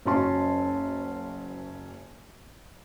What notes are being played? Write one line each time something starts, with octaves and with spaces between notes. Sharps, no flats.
F#1 F#3 C#4 A5 C6